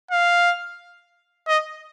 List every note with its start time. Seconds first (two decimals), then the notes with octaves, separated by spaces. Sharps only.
0.11 F5
1.48 D#5